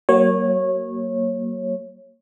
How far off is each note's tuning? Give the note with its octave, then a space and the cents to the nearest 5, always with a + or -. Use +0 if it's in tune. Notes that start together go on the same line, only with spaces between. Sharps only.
F#3 +30 A#3 +0 C#5 -20